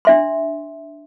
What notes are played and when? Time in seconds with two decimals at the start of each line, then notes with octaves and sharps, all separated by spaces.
0.05 D4 E5 C6